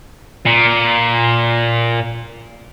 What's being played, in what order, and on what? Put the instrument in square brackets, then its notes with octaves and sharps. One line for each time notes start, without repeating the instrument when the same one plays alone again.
[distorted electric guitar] A#2